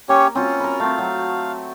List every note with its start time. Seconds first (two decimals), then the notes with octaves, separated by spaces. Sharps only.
0.09 A#3 C#4 G4 C#5
0.35 C4 C#4 F4 F#4
0.60 A#4 B5
0.80 A3 C4 F5
0.98 F#3